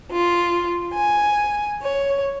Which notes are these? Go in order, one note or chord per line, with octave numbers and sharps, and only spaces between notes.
F4
G#5
C#5